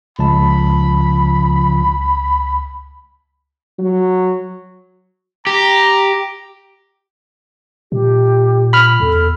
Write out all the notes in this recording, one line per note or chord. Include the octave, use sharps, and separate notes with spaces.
C#2 C#3 F3 A5 B5
F#3
G4 A#5
A#2 G4
B5 F6
E2 A4